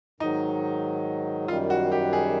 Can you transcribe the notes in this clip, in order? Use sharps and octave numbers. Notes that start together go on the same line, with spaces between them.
G#2 D#3 F#3 D#4
F#2 D#3 G3 F4
F#4
G4
G#4